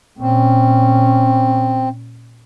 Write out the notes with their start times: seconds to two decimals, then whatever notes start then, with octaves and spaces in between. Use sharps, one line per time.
0.19 A#2 C4 C#4